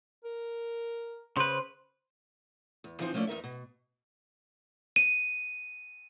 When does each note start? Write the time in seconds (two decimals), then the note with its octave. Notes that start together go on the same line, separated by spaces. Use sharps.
0.24 A#4
1.37 C#3 B4 C5
2.84 E2
3.00 E3 F3 C4 D#4 C5
3.14 F3 A3 A#3 C#4 E4 D5
3.27 E2 D#4 A#4 E5
3.44 B2
4.96 D#7